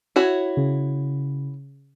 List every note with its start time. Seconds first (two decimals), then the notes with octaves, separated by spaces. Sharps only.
0.16 E4 F#4 C#5
0.57 C#3